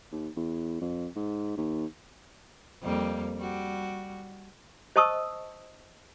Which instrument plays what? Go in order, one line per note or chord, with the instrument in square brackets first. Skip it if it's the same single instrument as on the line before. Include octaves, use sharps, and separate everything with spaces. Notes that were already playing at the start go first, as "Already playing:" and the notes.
[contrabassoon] D#2
E2
F2
G#2
D#2
[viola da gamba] F2 G3 A#3
G3 F#4
[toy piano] C5 D#5 A5 C#6 D#6 E6